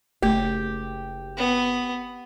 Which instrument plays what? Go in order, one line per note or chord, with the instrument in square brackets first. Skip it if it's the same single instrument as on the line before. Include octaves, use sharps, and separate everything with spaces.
[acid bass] F#1 [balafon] A3 [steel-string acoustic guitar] G4
[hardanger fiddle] B3